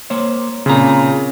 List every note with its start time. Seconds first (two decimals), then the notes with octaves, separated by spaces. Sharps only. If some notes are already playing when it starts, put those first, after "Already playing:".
0.10 A#3 C5 C#5
0.66 A#2 C#3 C4 A#5